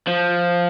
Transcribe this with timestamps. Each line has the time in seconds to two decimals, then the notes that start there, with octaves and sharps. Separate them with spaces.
0.07 F3